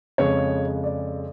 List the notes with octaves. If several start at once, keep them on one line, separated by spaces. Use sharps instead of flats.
F2 C#3 G#3 C#5
D5